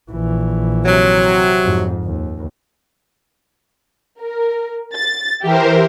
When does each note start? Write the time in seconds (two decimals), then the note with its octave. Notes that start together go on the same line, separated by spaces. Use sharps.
0.12 A#1 E3
0.85 C3 F#3
1.63 F2 G#2
2.03 D#2
4.21 A#4
4.95 A6
5.43 E3 G4 A#4 C5 E5